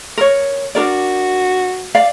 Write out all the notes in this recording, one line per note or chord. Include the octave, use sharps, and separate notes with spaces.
A#4 C#5
D4 F#4 A#4 D5
D5 F5